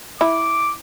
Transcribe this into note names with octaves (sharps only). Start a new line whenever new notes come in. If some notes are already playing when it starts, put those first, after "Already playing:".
E4 D6